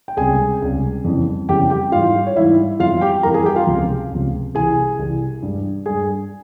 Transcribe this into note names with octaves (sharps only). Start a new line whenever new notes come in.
G5
C#2 C3 G3 G#4 G#5
C#2 C3 G3
F2 C#3 E3 G3
F2 C#3 E3 G3 G4 G5
G4 G5
G#2 E3 G3 F4 F5
C#5
G#2 E3 G3 E4 E5
F2 E3 G3 F4 F5
G4 G5
F2 E3 G3 A#4 A#5
G#4 G#5
G4 G5
F4 F5
C#2 C3 F3
C#2 C3 F3
C2 C3 E3 G#4 G#5
C2 C3 E3
G2 G3
G2 G3 G#4 G#5